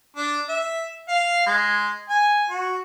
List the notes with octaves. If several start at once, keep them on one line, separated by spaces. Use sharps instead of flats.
D4
E5
F5
G#3
G#5
F#4